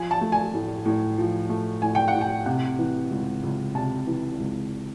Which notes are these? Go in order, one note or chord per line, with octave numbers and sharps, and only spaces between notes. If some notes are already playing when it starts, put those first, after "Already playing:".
Already playing: F3 G#5
A5
A3
G#5
A2
A2
F3
A3
A2 G#5
G5
F#5
A2
G5
C3 F#5
E3
C#2
C#2
C3 A5
E3
C#2